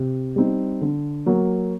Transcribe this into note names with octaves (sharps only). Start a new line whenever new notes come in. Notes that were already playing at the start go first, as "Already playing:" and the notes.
Already playing: C3
G3 C4 D#4
D3
F#3 A#3